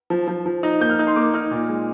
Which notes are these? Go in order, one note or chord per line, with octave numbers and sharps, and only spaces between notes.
F3
F3
F3
D#4
A#3 G6
F6
D#4
C6
A#3 D6
D#4 F6
A#2
G#3